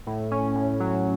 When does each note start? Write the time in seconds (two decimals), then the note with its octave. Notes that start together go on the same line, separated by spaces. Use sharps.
0.07 A2
0.31 C#4
0.55 A2
0.80 F#3